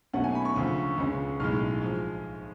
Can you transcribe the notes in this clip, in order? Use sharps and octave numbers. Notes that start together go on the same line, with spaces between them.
B1 B2 A3 C#4 F#5
G#5
B5
C#6
D2 C#3 F3
C#2 C#3 G#3 C#4
B1 A2 G#3 F6
F3 G#3